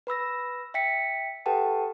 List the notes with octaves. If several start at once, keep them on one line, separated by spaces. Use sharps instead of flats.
B4 B5 E6 A#6
E5 G5 B6 C#7
G4 A4 B4 F#5 G5 A5